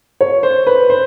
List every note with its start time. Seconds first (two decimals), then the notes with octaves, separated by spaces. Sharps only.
0.21 C#5
0.43 C5
0.67 B4
0.90 C5